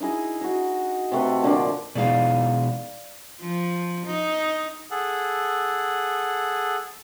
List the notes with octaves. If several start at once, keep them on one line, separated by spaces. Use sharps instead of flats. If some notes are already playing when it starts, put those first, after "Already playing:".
D#4 E4 G#4 D#5
D#4 F#4
C3 A3 B4
A#2 D3 F3 D5
B2 G#3 D#4 D5 F5
F3
D#4
G#4 A4 F#5